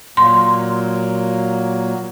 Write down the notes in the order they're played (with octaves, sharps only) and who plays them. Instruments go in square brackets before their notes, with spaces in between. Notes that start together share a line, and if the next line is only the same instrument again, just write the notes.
[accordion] A#2 F#3 A#3 [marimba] C6